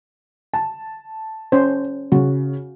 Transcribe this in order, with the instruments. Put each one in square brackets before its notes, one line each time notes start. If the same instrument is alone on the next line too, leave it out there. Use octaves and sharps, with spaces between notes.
[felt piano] A5
[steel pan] C#4 C5
[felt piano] C#3 [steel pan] F#4